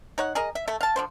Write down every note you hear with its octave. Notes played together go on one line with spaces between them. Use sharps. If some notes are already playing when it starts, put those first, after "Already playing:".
D#4 C#5 F#5
G#4 A#4 D#5
E5
A3 A4 E5
F5 A5
D3 F3 C5